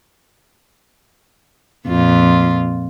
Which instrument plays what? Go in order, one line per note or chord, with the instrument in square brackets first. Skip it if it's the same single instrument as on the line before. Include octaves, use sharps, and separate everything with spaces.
[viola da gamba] F2 A#2 F4